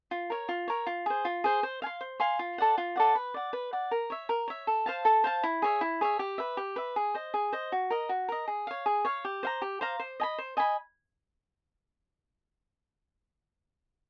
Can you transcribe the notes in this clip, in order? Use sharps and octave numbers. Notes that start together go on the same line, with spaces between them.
F4
A#4 C#5
F4
A#4 C#5
F4
G#4 C5
F4
G#4 C5
C5
F5 G#5 C6
C5
F5 G#5 C6
F4
A4 D5 F#5
F4
A4 D5 F#5
B4
D5 F#5
B4
D5 F#5
A#4
C#5 E5
A#4
C#5 E5
A4
C5 F5 A5
A4
C5 F5 A5
E4
G#4 C#5 E5
E4
G#4 C#5 E5
G4
B4 E5
G4
B4 E5
G#4
C5 D#5
G#4
C5 D#5
F#4
A#4 D#5
F#4
A#4 D#5
G#4
C#5 F5
G#4
C#5 F5
G4
C5 F5 A#5
G4
C5 F5 A#5
C5
D#5 G#5 B5
C5
D#5 G#5 B5